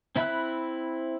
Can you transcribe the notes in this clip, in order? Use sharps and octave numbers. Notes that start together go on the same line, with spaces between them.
C4 E4 E5 B5 F#6